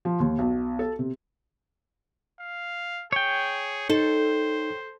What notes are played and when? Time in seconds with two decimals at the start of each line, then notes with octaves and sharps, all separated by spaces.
0.05 F3
0.20 D#2
0.38 B1
0.79 A4
0.99 C3
2.40 F5
3.12 G#4 C#5 G5
3.90 D#4 A4 C5